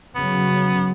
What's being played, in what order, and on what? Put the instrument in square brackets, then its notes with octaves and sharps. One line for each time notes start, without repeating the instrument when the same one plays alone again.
[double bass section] C#3 F#3 [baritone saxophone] B3